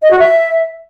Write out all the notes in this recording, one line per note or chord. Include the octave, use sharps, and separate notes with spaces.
D#5
F#4
E5